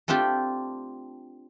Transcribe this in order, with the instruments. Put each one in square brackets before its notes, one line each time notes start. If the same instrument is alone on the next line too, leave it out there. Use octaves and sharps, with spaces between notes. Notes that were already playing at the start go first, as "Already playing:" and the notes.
[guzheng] A3 C4 D4 F4 G4